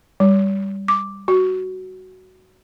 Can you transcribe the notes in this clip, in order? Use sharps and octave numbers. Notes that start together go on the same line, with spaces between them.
G3
D6
F#4